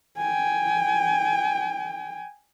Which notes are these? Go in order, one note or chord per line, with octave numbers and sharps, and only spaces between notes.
G5 G#5